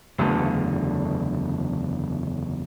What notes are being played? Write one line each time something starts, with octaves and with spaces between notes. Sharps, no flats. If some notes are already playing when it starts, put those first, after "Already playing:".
F#1 E2 D3 A3